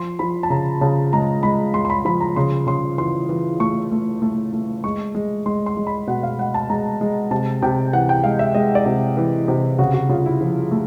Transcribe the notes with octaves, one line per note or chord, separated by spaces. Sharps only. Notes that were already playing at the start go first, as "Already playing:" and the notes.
Already playing: F3 C6
F3 B5
A5
C#3 A#5
C#3 A5
G#3 A#5
G#3 B5
G#3 C6
C6
B5
F3 B5
A#5
C#3 C6
C#3 C6
E3 C6
E3
A3 C#6
A3
A3
A3
G#3 C#6
G#3
G#3 C6
C6
G#3
B5
B2 F#5
F5
G#3 F#5
A5
G#3 A#5
G#3
C3 A5
C3 G5
E3 F#5
G5
G#3 F5
E5
G#3 D#5
D5
C3
E3
C3
C#3 F#4
F#4
C#3 F4
E4
F3
A3